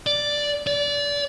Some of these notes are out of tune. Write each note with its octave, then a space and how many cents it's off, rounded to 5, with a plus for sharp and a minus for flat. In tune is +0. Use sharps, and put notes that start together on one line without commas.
D5 +0
D5 -25